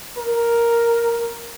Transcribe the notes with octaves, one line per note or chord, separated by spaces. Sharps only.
A#4